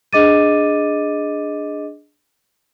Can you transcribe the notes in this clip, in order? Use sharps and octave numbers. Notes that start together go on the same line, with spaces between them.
D4 G#4 D#5 D6 A6 D#7